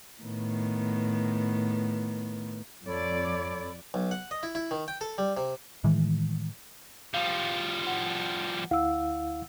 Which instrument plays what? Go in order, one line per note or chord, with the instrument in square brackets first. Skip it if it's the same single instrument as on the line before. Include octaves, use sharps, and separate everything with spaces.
[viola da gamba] A2 D#3 B3
[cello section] F2 D5 [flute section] A4 C#5 B5
[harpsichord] B1
F#5
D#5
E4
E4
D#3
G5
A4
G3
C3
[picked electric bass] A2 D#3 E3 G#3
[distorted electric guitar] F3 G3 [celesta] F5
[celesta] F#5
[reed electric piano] D2 E4 F5 [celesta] F#5 E6